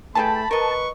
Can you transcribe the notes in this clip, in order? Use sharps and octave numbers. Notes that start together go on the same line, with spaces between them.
E3 A3 G#4 G5 A5 B5
A#4 B4 D#5 C#6